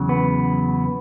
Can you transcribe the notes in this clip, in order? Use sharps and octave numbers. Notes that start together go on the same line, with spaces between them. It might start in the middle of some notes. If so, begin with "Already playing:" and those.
Already playing: E2 C#3 F#3
B3